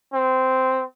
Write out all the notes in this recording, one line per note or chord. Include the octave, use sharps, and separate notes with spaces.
C4